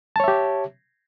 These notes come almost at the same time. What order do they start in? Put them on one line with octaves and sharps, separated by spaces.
A5 C#5 E5 G4